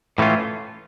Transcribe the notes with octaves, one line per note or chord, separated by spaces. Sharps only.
A2 E3 A3 C#4 F4